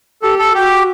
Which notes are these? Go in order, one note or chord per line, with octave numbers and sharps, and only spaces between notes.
G4 A4
A4
F#4 G4